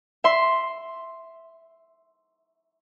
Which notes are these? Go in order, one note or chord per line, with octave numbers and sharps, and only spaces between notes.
E5 C6